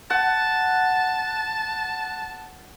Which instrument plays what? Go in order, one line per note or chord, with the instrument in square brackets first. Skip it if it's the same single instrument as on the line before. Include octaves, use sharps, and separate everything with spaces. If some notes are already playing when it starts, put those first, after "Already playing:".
[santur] F#5 [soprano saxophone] A5